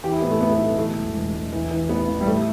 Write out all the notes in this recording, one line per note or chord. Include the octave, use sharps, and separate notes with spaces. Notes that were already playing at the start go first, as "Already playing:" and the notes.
E3 G4
E4
A2 B3
A3
A2 B3
B3
B1
A3
E3 A3
E1
E1
E1
E3
E3
A1 B3
A1
G3
A2 A3